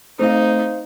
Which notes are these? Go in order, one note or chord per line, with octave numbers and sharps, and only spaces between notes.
A3 C4 D#4 C5 F5